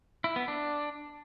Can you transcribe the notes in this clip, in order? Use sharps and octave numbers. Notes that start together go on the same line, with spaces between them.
E4
B3
D4